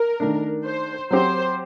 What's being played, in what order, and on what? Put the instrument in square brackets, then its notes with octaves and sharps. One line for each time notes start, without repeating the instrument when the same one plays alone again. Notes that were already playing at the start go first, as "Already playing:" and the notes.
Already playing: [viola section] A#4
[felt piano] D#3 A3 D4
[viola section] C5
[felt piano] F#3 C4 G4 [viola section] C5